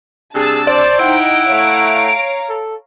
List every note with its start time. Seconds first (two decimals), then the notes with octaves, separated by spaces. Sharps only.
0.35 C3 G3 D4 G#4 A5 E6
0.67 C5 D5
0.99 D#4 E4 F#5 G5 D7
1.50 A3 C#5 F5 A#5
2.49 A4